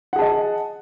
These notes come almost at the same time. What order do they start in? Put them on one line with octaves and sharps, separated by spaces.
F#5 G#4 A5 D#5